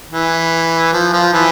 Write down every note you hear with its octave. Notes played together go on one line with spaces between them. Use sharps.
E3
F3
F3
E3